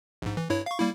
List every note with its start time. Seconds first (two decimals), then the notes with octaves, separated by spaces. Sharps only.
0.22 A#1 G#2
0.37 E3
0.50 G2 E4 C#5
0.66 F5 C#6
0.80 G3 A#3 E4